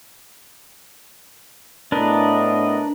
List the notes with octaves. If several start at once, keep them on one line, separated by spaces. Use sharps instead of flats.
A2 B3 D4 A#4 B4 D#5